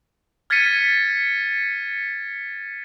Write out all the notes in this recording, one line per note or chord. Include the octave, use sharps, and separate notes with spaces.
F6 G#6 A6 B6 C#7 D#7